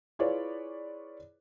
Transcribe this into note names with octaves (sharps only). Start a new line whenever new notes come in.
E4 F4 G#4 B4 C#5 D5